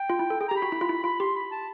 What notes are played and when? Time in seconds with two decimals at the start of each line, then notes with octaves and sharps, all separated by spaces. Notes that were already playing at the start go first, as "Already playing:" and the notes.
Already playing: G5
0.10 F4
0.19 E4
0.30 A4
0.40 G#4 G5
0.48 G4 A#5
0.57 B5
0.62 F#4
0.72 E4
0.81 F4
0.89 E4
1.04 F4 B5
1.20 G4 C6
1.36 B5
1.51 A5